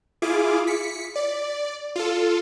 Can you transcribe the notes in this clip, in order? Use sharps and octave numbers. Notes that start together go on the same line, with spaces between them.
E4 F4 G#4 D6
B6 C#7
D5
F4 A4